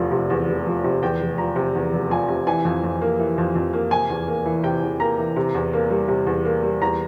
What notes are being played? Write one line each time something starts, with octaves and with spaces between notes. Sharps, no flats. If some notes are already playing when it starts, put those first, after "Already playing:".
Already playing: F1 E2 F3
C3
E2
F1
F3
C3
E2 G5
F1
F3 A#5
C3
E2
F1
F3 G#5
C3
E3 G#5
F2
F2
A#3
E3
F2
F2
A#3
C3 G#5
E2
A#3
E3
C3 G5
E2
A#3 A#5
E3
C3
E2
A#3
G3
C3
E2
A#3
G3
E2 A#5